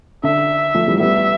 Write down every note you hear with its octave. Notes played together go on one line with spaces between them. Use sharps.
D3 E5
F3 A3
E3 G3
G3 B3 E5